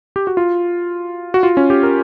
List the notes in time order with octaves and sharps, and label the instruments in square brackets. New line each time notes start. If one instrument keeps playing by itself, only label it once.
[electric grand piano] G4
F#4
F4
F#4
F4
C#4
G4
A#4